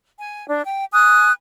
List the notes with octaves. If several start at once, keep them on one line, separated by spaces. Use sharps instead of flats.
G#5
D4
G5
G#5 D#6 F#6